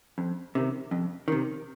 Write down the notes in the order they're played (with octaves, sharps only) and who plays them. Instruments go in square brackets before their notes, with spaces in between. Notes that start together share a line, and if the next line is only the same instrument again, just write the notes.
[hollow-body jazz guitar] F2
C3 D#3
F2
C3 D#3